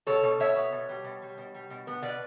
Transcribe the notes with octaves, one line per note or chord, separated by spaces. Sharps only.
B2 A4 C#5
B2
B2 C#5 E5
B3
B2
G3
B2
G3
B2
G3
B2
B3
B2 B4 D5